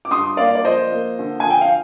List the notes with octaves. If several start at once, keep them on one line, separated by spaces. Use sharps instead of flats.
D6
G2 C6 D#6
A#3 D5 F5
D5
F3 C5 D#5
A#3
D3
F3 G#5
G5
F5